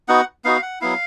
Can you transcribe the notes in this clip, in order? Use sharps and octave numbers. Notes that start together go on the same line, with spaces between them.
B3 D#4 F#4 F#5
B3 D#4 F#4 F5
F#5
F#3 B3 E4 F5